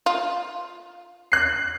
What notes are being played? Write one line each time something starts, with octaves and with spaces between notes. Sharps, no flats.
F4
F#6 C7